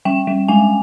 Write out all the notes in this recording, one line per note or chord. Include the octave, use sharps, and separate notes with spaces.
G3 G5
G3
G#3 G#5